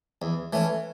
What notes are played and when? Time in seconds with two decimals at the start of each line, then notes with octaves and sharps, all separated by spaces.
0.22 E2
0.53 E3 A3 C#4